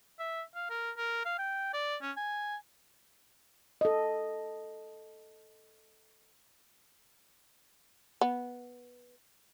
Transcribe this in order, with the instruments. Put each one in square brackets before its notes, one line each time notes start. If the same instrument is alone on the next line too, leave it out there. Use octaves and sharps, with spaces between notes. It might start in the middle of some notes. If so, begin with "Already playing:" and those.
[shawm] E5
F5
A#4
A#4
F5
G5
D5
C#4
G#5
[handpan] A4 D#5
[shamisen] B3